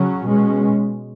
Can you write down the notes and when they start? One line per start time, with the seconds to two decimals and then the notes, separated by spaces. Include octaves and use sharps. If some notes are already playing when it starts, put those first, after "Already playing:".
Already playing: C#3 F#3 C#4
0.29 B2 G#3 C#4